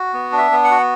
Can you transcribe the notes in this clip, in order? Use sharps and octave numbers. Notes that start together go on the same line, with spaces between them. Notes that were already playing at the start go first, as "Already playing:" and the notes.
Already playing: F#4
B3
D4
E5
B3
F#5
F#4